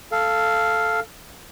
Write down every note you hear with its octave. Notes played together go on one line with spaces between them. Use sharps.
A4 F5